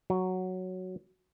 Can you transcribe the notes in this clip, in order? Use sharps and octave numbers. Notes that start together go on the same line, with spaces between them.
F#3